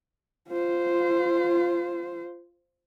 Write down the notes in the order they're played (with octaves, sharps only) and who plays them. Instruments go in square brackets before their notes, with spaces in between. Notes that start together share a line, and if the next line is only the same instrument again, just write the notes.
[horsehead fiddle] F4 C5